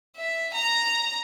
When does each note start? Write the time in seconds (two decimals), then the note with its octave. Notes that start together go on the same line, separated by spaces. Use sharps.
0.16 E5
0.54 A#5